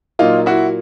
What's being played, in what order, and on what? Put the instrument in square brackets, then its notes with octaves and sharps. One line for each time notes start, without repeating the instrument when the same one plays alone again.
[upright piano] A#2 F#3 A#3 D#4 F4
E4 F#4